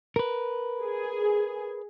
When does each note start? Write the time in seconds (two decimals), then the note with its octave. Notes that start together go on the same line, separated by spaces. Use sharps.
0.16 A#4 B4
0.82 G#4